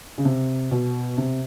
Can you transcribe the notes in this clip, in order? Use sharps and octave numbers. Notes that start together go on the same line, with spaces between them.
C#3
C3
B2
C3